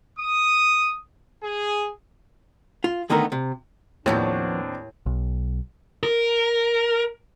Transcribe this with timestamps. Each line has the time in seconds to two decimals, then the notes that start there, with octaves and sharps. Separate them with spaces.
0.17 D#6
1.42 G#4
2.84 F4
3.10 D3 D#3 A3 B3 D#4 A#4
3.32 C3
4.06 D#2 A2 F3 B3 C4 D4 F#4
5.06 B1
6.03 A#4